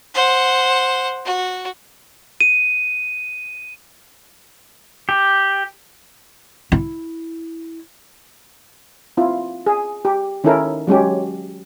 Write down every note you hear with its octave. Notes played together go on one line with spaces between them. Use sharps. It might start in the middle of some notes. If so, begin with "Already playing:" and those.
C5 F#5
F#4
D#7
G4
E4
C4 E4 F4
G#4
G4
D#3 C#4 D#4 E4 A4 A#4
F#3 G#3 C#4 G4